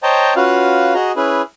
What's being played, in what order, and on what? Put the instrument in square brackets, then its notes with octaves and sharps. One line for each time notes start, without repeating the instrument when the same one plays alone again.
[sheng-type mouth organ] C5 C#5 D#5 G5 A5 A#5
C#4 F4 F#4 B4 F5
F#4 G#4 D#5 A#5
C#4 E4 G#4 B4